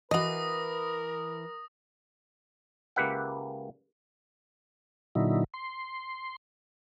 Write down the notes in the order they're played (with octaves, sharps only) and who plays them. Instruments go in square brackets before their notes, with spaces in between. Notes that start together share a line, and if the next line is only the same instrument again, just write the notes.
[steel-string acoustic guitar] E3 B4 [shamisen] F#4 D#5 [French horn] A#4 [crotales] D#6 A#6
[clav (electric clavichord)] C#2 A#3 G4 B4 E5 F#5
[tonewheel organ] A#2 D3 F#3 D#4 E4
C6